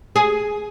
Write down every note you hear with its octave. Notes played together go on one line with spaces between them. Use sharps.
G#4